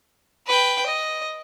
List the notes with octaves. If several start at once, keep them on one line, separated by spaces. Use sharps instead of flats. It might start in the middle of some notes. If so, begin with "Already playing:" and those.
B4 G5
D#5